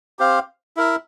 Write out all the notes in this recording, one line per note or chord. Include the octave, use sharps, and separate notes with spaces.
C4 G4 C5 F5
E4 A#4 E5